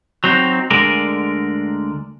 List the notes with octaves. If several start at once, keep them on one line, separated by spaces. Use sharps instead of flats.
F#3 C4 D#4
D2 D3 G#3 A#4 D5